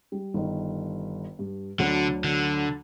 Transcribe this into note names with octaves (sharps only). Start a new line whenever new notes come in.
G3
G1 D#3
G2
D2 D3 F#3 D4
D3